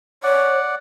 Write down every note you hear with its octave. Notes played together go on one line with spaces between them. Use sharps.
C#5 D5 F#5